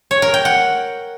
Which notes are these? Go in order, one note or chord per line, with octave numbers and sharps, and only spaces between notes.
C#5
A#4
G5
F#5